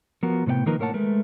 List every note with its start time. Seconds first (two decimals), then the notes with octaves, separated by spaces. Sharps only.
0.23 F3 B3 F#4 A#4
0.46 A2 C3 B3 D5 G5
0.66 D#3 F3 A#3 D#4 A#4 B4
0.79 A2 A#3 A#4 C#5 F#5 A5
0.94 G#3 A3 A#4 B4